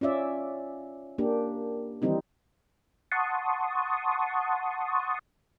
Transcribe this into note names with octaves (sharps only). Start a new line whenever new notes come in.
C#4 F4 D5 E5
A#3 D4 G4
D#3 E3 G3 C4 D#4
F#5 A5 C6 C#6 D#6